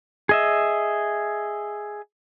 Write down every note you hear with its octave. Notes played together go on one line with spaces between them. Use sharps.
G#4 D#5 E5